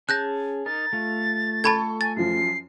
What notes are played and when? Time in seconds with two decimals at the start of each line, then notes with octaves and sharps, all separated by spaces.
0.09 C#4 G#4 A5 F#6 G6 A#6
0.66 D#4 A#4 A6
0.93 A3 F4
1.64 A4 A5 B5 C#6 G#6
2.01 G#5 A6
2.16 F#2 F3 C7